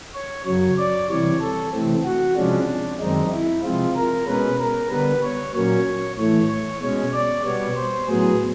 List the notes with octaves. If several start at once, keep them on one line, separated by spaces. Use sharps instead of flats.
C#5
F#2 C#3 F#3 C#5
D5
C3 E3 G3 C#5
A4
C3 E3 A3 C4
F#4
C3 F3 G#3 C#4 D4
F#2 D#3 G#3 C4 D#4
E4
C3 F3 G#3 C4 F4
A#4
B2 G#3 C#4 B4
A#4
D3 G3 B3 B4
C#5
A#2 F#3 A#3 C#4 C#5
A2 E3 A3 C#5
C#5
B2 G#3 C#4 C#5
D5
B2 G3 B3 C#5
C5
A2 F#3 B3 G#4